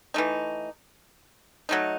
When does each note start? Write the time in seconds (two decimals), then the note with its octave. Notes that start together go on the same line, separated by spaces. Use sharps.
0.14 E3 A3 D#4
1.69 F#3 A3 D#4